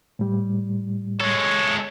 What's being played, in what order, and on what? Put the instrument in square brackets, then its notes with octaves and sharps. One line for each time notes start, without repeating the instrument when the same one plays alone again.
[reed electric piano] A2 G3
[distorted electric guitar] G#3 A4 [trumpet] C#5